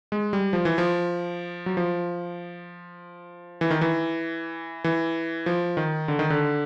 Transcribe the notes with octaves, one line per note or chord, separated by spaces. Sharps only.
G#3
G3
F3
E3
F3
F#3
F3
E3
D#3
E3
E3
F3
D#3
D3
D#3
D3